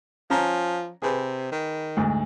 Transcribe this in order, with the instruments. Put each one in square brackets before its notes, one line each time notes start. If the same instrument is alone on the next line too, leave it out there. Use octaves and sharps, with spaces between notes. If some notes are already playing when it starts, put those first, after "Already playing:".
[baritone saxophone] F3 [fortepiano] C#4 A#5
[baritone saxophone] C3 [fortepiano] G#4 B4
[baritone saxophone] D#3
[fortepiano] D2 G#2